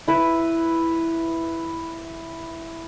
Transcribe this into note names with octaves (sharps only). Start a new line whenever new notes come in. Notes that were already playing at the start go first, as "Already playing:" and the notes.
E4 B4